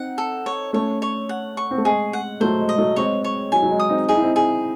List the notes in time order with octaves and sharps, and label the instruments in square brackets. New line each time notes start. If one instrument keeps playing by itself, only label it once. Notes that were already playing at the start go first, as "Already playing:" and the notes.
Already playing: [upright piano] C4 D#4 [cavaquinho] F#5
[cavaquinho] A4
C#5
[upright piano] A3 C#4 [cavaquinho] C#5
[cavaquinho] C#5
F#5
C#6
[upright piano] C4
A3
[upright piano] G#3 [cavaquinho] G#4
[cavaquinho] F#5
[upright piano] F#3 A3 [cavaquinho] C5
[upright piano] G#3
[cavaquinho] D#5
[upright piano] F#3 A3
[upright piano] G#3 C4 [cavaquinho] C#5
[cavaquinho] C#5
[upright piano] F#3 [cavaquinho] G#5
[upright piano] F#3
G#3
[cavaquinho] D#6
[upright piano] C4 D#4
[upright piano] D#4 [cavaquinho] G#4
[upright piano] E4
C4 D#4
[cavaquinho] G#4